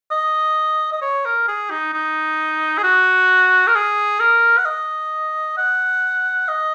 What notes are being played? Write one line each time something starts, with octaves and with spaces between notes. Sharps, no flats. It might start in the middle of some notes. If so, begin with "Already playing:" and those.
D#5
D#5
C#5
A#4
G#4
D#4
D#4
G#4
F#4
A#4
G#4
A#4
F#5
D#5
F#5
D#5